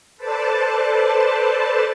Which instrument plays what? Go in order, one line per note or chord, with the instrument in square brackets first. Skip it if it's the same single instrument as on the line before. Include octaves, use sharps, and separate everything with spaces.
[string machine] A4 B4 C5 D5 A5